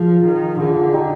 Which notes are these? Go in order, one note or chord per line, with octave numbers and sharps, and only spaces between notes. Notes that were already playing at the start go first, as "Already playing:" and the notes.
Already playing: F3 F4 G#4
D#3
D3 F4 G#4
D#4 G4